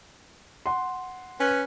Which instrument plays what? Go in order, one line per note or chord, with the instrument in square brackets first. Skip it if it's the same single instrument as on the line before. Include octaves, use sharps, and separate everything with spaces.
[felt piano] F#5 C6
[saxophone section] C#4 B4